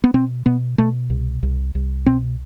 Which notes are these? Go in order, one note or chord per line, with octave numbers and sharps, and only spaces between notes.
B3
B2 C4
B2 B3
B2 A3
C2
C2
C2
B2 C4